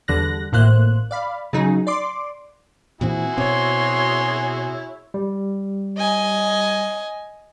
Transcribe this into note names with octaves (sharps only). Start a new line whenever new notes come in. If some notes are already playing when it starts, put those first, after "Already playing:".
E2 D3 G3 F#6 A#6
G#1 A2 A#3 C5 F#6
D5 F5 B5
C#3 F#3 D#4 G#4
D5 C6 D6
A#2 E3 C4 E4 F#4 G#4
B2 C4 C#5 C6
G3
D#5 G#5